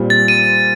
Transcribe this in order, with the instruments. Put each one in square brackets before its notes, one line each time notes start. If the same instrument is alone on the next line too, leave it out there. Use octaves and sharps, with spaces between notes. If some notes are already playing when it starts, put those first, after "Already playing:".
Already playing: [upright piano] A#2 G3 C4
[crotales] A6
D#7